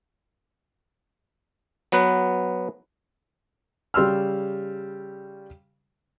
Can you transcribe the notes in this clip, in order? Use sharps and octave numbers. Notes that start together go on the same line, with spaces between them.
F#3 B3 B4
C#3 G3 C6 E6 F6